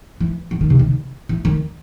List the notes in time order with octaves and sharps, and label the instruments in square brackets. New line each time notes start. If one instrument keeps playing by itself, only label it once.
[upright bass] E3
E3
D#3
C3
D#3
E3
D#3